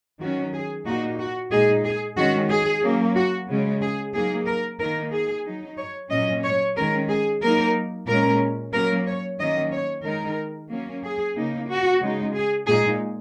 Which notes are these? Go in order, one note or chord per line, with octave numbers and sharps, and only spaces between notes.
D#3 F#3 C#4 F#4
G#4
A#2 A#3 D#4 F#4
F#4
A#2 G#3 D#4 G#4
G#4
D#3 G#3 C#4 F#4
G#4
F#3 A#3 C#4
F#4
C#3 G#3 C#4
G#4
F#3 A#3 D#4 G#4
A#4
D#3 A#3 D#4 A#4
G#4
F#3 D#4
C#5
A#2 F#3 C#4 D#5
C#5
D#3 G#3 C#4 A#4
G#4
F#3 A#3 D#4 A#4
A#2 G#3 C#4 A#4
F#3 A#3 C#4 A#4
C#5
D#3 F#3 A#3 C#4 D#5
C#5
D#3 G#3 D#4 A#4
F#3 A#3 C#4
G#4
C#3 A#3 D#4
F#4
C#3 G#3 D#4
G#4
A#2 G#3 D#4 G#4